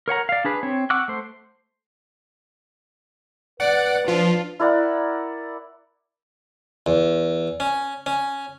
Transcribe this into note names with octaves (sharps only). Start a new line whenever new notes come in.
A#4 C#5 F#5 A#5
D5 F5
D4 G#4 B4
C4 C#5
F#5 C#6 D6 E6 F#6
A3 C5
B4 D5 F#5
F3 D4 F4
E4 A#4 D5 F#5
E2
C#4
C#4